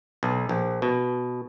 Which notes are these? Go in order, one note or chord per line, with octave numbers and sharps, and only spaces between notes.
B1
A#1
B2